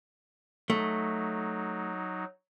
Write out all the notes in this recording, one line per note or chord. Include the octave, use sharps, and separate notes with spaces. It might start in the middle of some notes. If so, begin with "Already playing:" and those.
F#3 A3 D#4